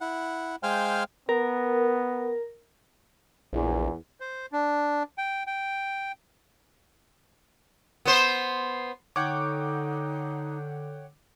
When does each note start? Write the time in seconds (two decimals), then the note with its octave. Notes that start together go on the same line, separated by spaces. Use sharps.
0.01 E4 F#5
0.63 G#3 C5 F5 G5 G#5 F6
1.29 B3 A#4
3.53 A#1 E2
4.21 C5
4.53 D4
5.18 G5
5.47 G5
8.05 B3 C5
9.16 D3 D#4 C#5 F#5 G5 D6